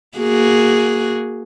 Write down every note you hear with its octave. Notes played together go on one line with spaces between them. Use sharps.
A#3 F#4 G#4